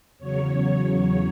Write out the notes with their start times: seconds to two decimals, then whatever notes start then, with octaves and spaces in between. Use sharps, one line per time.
0.18 E2 C#3 F#3 C#5